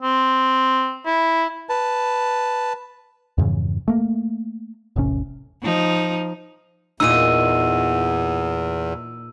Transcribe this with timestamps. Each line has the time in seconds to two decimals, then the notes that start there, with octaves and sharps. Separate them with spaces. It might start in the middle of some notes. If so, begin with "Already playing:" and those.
0.02 C4
1.06 E4
1.69 B4 A5
3.38 F2 G#2 C#3 E3
3.88 A3 A#3
4.96 E1 A1 C3 C#4
5.62 F3 D#4
7.00 E2 A#2 D#4 E6 D#7